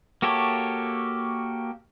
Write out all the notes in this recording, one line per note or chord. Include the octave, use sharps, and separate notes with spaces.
A#3 F#4 G4 A4 C#5